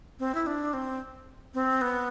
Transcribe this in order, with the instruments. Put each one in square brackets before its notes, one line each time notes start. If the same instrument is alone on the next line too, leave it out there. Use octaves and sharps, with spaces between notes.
[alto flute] C4
E4
D4
C4
C4
B3